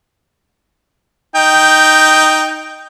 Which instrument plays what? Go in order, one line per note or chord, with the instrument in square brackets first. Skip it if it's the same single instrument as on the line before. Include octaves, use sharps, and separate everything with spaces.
[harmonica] D#4 G5